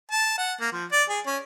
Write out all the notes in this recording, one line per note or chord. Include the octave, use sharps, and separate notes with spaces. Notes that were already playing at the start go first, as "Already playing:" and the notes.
A5
F#5
A#3
F3
D5
G#4
C#4